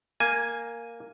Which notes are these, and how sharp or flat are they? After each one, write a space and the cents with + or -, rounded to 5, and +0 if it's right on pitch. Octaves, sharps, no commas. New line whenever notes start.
A#3 +0 G#5 +0